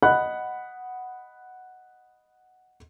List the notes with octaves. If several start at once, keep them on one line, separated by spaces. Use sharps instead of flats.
D#5 F#5 B5 F#6